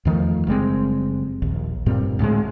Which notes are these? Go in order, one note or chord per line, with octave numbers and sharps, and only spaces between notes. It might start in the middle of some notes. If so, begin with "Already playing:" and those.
E2 D#3 F3 A3
F#1 G3 G#3 C4
A#1 D#2
G2 A#2 G3 C4
D2 A2 G3 G#3